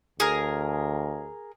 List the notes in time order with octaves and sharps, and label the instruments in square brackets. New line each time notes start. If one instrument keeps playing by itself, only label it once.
[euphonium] D2 [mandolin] G#4 A#4